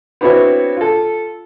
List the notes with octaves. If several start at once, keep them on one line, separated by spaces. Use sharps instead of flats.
B3 C4 D4 E4 F#4 C#5
F4 A4